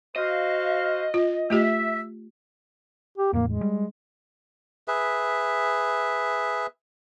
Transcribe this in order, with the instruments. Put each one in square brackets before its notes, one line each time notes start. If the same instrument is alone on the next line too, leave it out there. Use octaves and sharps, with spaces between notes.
[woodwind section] F#4 C5 F5 [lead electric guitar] D#5
[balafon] F4
[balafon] A3 F4 G4 [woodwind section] E5
[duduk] G4
[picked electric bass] E2 A2 [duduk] A#3
[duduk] G#3
[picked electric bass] G3
[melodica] G#4 B4 E5